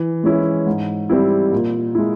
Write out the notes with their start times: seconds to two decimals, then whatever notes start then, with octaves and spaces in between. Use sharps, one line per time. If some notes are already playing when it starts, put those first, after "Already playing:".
Already playing: E3
0.23 G#3 C#4 E4
0.66 G#2
1.09 G3 C4 E4
1.52 A#2
1.95 G#3 E4